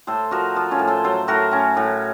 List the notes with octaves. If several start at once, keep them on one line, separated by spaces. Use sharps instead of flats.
A2 A4 C5
F3 F#4 A#4
F3 F4 A4
C#4 F4
A2
A4 C5
F#3 A4 C5
A2 F#4 A#4
A2 C#4
A2